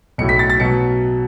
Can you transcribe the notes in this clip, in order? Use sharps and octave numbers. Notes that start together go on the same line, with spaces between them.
B1 A2 F#3 C#7
B6
A6
A6
B2 F#3 C#7